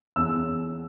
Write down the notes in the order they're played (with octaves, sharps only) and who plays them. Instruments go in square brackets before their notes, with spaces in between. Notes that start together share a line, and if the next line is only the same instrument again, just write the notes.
[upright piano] E2 E6